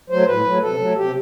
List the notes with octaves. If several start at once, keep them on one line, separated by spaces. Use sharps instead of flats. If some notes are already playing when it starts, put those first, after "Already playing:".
F#3 A3 C5
A2 B4
F#3 A3
C3 A4
F#3 A3
C3 G4